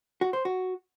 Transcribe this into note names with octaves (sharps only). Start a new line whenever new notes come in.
F#4
C5
F#4